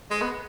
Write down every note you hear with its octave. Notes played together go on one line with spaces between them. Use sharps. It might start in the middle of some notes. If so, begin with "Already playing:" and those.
G#3
B3